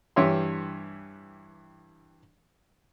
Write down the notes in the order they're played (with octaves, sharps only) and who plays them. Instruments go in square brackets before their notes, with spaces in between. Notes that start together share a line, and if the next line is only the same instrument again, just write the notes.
[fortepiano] G2 E3 G4 C#5 E5 C6